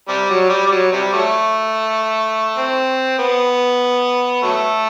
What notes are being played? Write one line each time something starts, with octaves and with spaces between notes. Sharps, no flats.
C3 G3
F#3
G3
G3
F#3
C3 G3
F#3 A3
C4
B3
F#3 A3